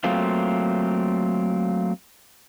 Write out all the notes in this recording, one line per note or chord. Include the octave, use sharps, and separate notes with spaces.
F#3 A3 A#3 C4 F4